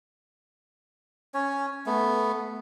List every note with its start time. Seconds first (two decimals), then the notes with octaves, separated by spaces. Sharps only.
1.34 C#4 C#5
1.86 A3 B3